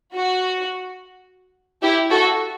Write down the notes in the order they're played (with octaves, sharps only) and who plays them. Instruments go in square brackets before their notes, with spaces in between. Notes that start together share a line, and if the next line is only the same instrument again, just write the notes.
[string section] F#4
E4 G4
F#4 A4